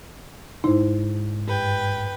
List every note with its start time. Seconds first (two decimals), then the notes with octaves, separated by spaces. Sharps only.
0.64 D2 G#2 D#4 E4 C5
1.48 G2 B4 G5